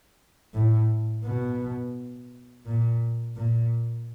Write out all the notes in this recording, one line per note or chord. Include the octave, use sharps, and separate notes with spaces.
A2
B2
A#2
A#2